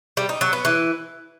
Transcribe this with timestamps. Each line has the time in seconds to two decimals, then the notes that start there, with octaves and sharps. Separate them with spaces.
0.17 G3
0.29 D#4
0.41 F#3
0.53 B3
0.65 E3